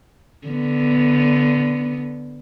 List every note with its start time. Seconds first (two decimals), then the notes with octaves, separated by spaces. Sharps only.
0.47 D3 B3